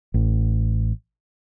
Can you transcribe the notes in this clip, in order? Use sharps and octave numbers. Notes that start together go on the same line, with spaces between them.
A1